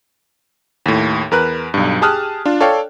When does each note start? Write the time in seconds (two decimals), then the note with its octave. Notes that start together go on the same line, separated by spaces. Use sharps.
0.86 D#2 A2
1.31 E2 A#4 B4 F#6
1.74 B1 G2
2.01 G4 G#4 A5 D#6 F6 F#6
2.45 D4 F4
2.61 A4 C#5 D5 F5 G5